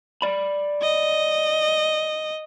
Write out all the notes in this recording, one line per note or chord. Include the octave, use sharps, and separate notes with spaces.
D5 B5
D#5